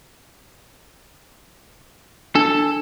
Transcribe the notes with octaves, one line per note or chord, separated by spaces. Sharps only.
D4 A4